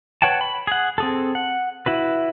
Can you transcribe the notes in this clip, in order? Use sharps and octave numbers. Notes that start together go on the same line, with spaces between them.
B4 C#5 F#5 G5 A5
B5
G#4 F#5
C4 G#4 A4
F#5
E4 F#4 B4